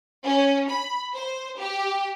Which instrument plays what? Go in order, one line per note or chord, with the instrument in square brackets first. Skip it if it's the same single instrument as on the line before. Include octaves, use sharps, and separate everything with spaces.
[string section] C#4
B5
C5
G4